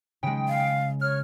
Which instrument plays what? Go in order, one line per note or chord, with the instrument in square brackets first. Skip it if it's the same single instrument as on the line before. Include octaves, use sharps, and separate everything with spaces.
[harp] C#3 G#3 [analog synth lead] G5
[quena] F5
[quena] C#5 [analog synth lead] F6